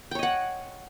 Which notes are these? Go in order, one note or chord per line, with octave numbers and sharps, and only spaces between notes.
C#5 D#5 F#5 G5